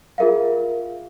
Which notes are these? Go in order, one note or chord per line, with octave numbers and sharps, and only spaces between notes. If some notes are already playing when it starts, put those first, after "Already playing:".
F4 G#4 A#4 E5 F5